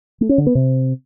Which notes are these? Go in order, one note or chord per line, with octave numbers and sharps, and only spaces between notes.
A3
C#4
D3
B3
C3